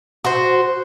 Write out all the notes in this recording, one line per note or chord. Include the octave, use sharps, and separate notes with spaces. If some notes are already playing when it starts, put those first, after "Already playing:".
F#4 C5